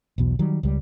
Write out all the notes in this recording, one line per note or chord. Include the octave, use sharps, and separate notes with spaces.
B1 E2 B2
D#3 F#3 G3
C#2 G3